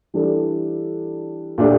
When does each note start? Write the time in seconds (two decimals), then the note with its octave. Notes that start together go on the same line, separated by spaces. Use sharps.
0.14 E3 G3 D4 A4
1.58 A#2 A3 D4 G4